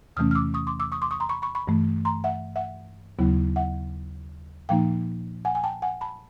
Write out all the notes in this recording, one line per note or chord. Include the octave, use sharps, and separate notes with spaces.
E2 C3 E3 A3 C#4 D#6 F6
F6
D6 E6
C#6 D#6
C6 D6
D6 E6
C#6 D#6
C6 D6
C#6 D#6
A#5 C6
B5 C#6
B5 C#6
B5 C#6
G2 E3 A3
A#5 C6
E5 F#5
E5 F#5
D#2 C#3 F#3 B3 E4
E5 F#5
A#2 F3 A#3 D#4 F5 G5
F#5 G#5
G#5
G5 A5
F#5 G#5
A5 B5